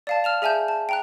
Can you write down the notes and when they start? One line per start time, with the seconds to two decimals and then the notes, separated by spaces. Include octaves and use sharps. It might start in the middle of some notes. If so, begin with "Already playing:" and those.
0.07 D5 F5 A5
0.24 A5 F6 E7 F7
0.42 G#4 E5 G#5 A5 G6
0.68 A5
0.89 G5 A#5 F#6